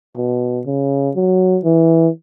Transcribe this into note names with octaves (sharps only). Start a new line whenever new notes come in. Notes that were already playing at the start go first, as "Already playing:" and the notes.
B2
C#3
F#3
E3